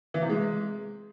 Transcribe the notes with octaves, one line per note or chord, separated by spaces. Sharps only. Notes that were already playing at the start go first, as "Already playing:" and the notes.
E3
C3
G#3